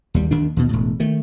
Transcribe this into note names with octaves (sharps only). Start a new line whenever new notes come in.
D#2 G3
D#2 D#3 D4
D#2 B2
E1 A2
D#3 A3